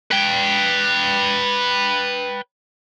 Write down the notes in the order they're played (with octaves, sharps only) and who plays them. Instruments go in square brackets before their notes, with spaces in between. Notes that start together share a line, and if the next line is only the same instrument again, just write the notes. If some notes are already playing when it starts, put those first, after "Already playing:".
[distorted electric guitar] B4 G5